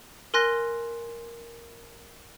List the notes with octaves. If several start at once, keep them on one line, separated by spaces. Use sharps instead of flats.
A#4 G#5 C6 F#6 A#6